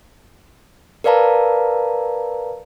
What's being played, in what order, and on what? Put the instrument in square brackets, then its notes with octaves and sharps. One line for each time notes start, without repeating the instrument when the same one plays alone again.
[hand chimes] A#4 B4 D5 F5 A5 A#5